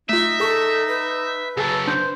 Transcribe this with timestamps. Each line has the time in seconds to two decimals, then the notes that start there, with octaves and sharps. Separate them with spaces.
0.09 A3 D#4 F4 E5
0.40 G#4 A4 C#6
0.88 B4
1.57 C#3 F#3 G#4 A4 G#5 E6
1.88 D4 C5 G6